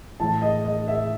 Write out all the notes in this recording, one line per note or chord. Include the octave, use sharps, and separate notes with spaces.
A2 E3 A5
D#5
D#5
E5